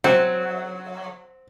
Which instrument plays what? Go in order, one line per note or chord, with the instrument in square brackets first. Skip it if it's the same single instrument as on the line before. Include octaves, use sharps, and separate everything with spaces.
[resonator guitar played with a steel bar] F#3 [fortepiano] C4